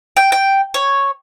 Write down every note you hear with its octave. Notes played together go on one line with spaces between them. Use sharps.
G5
G5
C#5